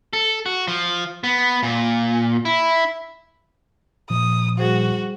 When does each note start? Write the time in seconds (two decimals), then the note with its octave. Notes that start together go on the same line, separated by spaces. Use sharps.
0.13 A4
0.46 F#4
0.68 F3
1.24 B3
1.63 A#2
2.45 E4
4.10 A#2 F3 D#6
4.59 G3 F#4 G#4 C5